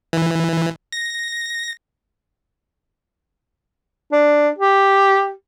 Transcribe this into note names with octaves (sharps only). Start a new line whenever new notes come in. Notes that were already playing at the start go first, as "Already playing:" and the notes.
E3
A#6
D4
G4